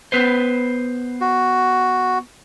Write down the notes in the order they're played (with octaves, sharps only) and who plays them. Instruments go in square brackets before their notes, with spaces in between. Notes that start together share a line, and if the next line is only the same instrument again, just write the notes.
[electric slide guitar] B3 B4 C5
[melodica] F#4